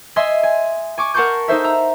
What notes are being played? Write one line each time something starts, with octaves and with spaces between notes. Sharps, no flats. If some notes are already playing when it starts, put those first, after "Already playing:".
D#5 E5 G#5 C6
G#5
G#5 C#6 D6
A#4 F#5 A5 C6 C#6 G6
D#4 A4 C5 E5
A#5 E6